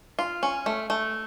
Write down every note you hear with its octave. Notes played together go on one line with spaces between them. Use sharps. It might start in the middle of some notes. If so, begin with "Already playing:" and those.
F4
C#4
A3
A3